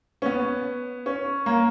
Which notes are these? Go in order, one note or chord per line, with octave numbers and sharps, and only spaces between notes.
C#4
B3
C#4
A#3